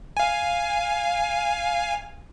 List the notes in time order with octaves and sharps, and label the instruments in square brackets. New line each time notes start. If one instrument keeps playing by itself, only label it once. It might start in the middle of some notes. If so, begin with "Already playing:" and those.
[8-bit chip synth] F5 G#5